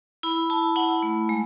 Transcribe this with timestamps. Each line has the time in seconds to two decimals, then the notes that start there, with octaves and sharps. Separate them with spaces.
0.23 E4 B5
0.50 E4 A5
0.76 E4 F#5
1.02 A3
1.29 G#3